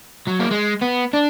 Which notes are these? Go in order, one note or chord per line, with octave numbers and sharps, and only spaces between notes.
F#3
A#3
G#3
B3
D4